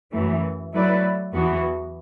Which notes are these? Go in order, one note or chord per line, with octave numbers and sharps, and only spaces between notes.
F#2 E3 A3
F#3 A3 E4 B4 D5
E2 E3 B3 F#4